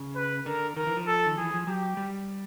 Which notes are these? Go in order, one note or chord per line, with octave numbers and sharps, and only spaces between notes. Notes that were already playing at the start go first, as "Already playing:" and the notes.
Already playing: C#3
B4
D3 A#4
D#3 A#4
E3
F3
A4
D#3
E3 G#4
F3
F#3 G4
G3